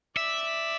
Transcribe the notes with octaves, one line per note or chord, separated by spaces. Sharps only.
D5 E5